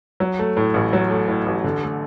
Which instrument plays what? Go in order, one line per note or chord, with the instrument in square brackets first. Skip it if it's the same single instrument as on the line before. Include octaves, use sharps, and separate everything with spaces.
[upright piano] F#3
A3
A2
A1
F#3
A3
A2
A1
D3
A3